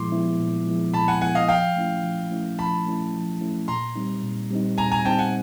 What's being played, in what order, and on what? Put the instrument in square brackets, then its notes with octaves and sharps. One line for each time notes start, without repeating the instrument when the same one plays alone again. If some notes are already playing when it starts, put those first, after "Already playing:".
Already playing: [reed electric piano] A#2 F3 G#3 B3 E4 [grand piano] C6 D6
[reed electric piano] F3 G#3 B3 E4
A#2
F3 G#3 B3 E4
[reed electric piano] A#2 [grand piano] A5 B5
[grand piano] F#5 G#5
[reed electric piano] F3 G#3 B3 E4 [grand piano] F#5 G#5
[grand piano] D#5 F5
[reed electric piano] F3 [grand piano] F5 G5
[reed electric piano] A3 C#4 E4
F3
A3 C#4 E4
[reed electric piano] F3 [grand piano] A5 B5
[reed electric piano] A3 C#4 E4
F3
A3 C#4 E4
[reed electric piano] A#2 [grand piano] A#5 C6
[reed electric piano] G3 C4 D#4
A#2
G3 C4 D#4
[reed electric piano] A#2 [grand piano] G#5 A#5
[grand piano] G#5 A#5
[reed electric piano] G3 C4 D#4 [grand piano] G5 A5
[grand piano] F#5 G#5